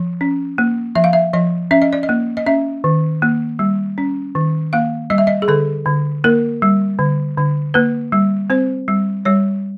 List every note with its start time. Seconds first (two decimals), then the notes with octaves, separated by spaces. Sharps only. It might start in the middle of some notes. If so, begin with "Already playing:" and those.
Already playing: F3
0.21 C#4
0.58 A#3
0.95 F3 E5
1.04 F5
1.13 E5
1.33 F3 D#5
1.71 C#4 E5
1.82 D#5
1.93 D5
2.03 D#5
2.09 A#3
2.37 D#5
2.46 C#4 E5
2.84 D#3
3.22 A#3
3.59 G3
3.98 C#4
4.35 D#3
4.73 A#3 F5
5.10 G3 D#5
5.18 E5
5.27 D#5
5.42 G#4
5.48 D3 A4
5.86 D3
6.24 A#3 A#4
6.62 G3
6.99 D3
7.38 D3
7.74 A#3 B4
8.12 G3
8.50 C4 C5
8.88 G3
9.25 G3 C#5